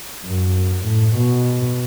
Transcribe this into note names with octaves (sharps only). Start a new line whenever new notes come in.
F#2
A2
B2